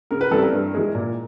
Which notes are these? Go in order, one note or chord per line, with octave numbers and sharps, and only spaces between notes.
C#3 A#4
B4
E3 G3 C4 A4
A#4
G2
E3 G#3
A#2